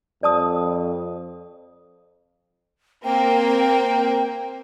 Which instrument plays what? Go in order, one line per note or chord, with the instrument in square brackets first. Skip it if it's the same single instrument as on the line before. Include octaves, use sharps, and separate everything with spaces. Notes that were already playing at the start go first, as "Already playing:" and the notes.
[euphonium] F2 [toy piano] D5 A5 D#6
[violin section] A#3 C4 A#4 [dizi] G5